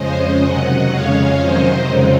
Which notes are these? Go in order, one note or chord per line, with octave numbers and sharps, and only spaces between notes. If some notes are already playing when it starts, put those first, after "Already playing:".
Already playing: F2 C#3 G#3 C#4 C5 D#5
C3 D#3 F#3 D#5 F#5
F2 C#3 G#3 C#4 C#5 F5
C3 D#3 F#3 C5 D#5
F2 C#3 G#3 C4 D#4